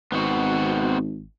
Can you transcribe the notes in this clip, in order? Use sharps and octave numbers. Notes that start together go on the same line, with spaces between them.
G#1 B3 C4 F#4